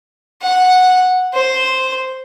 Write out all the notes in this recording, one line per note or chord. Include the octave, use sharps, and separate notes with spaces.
F#5
C5